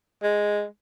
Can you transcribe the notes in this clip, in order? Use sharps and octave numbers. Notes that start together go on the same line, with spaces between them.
G#3